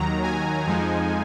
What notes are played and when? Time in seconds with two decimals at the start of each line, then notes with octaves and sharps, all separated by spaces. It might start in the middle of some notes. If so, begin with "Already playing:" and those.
Already playing: D#2 D#3 F#3 A#5
0.23 G#5
0.67 F2 F3 G#3 D#4